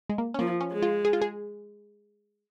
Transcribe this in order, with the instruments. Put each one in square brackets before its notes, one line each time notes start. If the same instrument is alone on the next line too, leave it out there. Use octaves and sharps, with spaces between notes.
[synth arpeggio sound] G#3
A#3
C#4
[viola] F3 [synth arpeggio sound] A#3
[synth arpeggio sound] C#4
[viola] G#3
[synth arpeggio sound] F4
G#4
F4
G#4